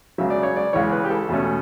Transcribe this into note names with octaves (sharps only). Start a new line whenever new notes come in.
C#2 C#3 F#3 E5
D5
C#5
D5
C#2 C#3 E3 C#5
B4
G4
A4
E2 B2 A3 C#4